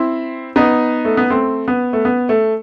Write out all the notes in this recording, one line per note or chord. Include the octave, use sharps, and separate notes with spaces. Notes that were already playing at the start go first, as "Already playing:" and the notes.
Already playing: C4 E4
B3 D#4
A3
B3
A3 C4
B3
A3
B3
A3